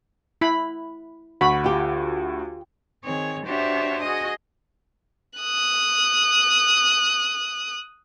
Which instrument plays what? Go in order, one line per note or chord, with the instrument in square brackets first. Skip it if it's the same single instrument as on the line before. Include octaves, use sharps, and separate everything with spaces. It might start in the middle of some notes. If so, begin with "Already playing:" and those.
[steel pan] E4 B5
[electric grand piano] D2 F#4 [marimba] F#5 C#6 [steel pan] B5
[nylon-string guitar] F4 G4
[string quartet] D#3 C4 G#4 C#5
D4 F#4 G4 C5 C#5 E5
F#4 G#4 D#5 D#6
[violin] D#6 F#6